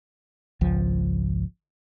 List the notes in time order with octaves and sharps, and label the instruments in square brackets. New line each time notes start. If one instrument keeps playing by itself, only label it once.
[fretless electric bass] G#1 C#2 F3